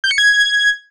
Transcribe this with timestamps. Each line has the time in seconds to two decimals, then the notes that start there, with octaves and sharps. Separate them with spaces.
0.04 G6
0.11 C#7
0.18 G#6